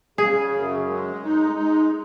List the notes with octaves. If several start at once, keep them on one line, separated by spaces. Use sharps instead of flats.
C#3 G#4
F#2
G#3
D#4
G#3